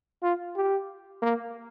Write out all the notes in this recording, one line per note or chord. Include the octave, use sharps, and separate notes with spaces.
F4
G4
A#3